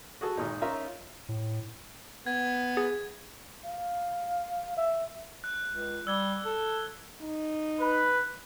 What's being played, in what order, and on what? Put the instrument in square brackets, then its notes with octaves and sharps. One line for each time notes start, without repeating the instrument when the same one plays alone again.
[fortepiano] F#4 G#4 A4
G#1 A#2 D#4
C#4 D#4 F4 A#4 E5 A#5
[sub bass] A2
[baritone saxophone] B3 [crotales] G#6
[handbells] G#4
[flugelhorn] F5
E5
[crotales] F#6
[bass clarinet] C#2
[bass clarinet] G3 [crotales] E6 G#6 G7
[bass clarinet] A4
[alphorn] D#4
[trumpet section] B4